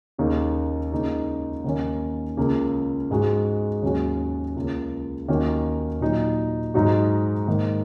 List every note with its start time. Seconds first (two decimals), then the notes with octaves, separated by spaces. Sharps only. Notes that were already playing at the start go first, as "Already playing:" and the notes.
0.18 D#2 C#3 A#3 D#4
0.92 C#2 C#3 A#3 D#4
1.64 D#2 D#3 A#3 C#4
2.37 C#2 C#3 A#3
3.11 G#2 G#3 F#4
3.82 D#2 C#3 F#3 C#4 F#4
4.56 C#2 C#3 A#3
5.28 D#2 D#3 A#3 C#4 F#4
6.01 A#2 F#3 D#4
6.74 G#2 F#3 D#4 F#4
7.47 G#2 D#3 A#3